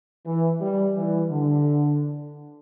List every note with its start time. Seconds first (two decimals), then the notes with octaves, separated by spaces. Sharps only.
0.25 E3
0.60 G3
0.96 E3
1.30 D3